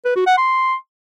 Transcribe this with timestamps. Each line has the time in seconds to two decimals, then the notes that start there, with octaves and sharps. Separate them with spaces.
0.05 B4
0.16 F#4
0.27 F#5
0.37 C6